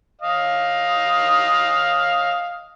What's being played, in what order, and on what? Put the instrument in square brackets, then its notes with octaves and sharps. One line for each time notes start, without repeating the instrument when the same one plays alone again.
[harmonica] D#5 F5